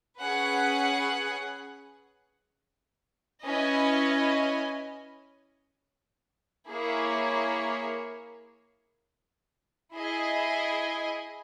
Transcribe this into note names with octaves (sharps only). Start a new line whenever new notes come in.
C#4 G#4 B4 F#5
C#4 E4 B4 D#5 G#5
A#3 E4 G#4 C#5
E4 G#4 D#5 G#5